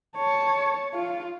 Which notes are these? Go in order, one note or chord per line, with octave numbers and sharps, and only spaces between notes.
C#5 A5
F4